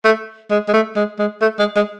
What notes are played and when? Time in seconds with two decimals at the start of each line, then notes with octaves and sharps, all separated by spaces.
0.05 A3
0.51 G#3
0.68 G#3
0.74 A3
0.96 G#3
1.19 G#3
1.42 A3
1.59 G#3
1.76 G#3